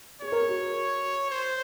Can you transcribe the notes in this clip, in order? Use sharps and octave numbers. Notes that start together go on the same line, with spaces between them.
G#4 C#5
A#4
G#4
F#4
C5